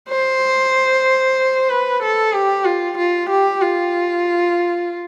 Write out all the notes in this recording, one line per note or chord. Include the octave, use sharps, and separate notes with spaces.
C5
B4
A4
G4
F4
F4
G4
F4